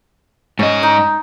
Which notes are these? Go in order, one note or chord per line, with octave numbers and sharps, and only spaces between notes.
G#2 C#4 D#5
D#4 D5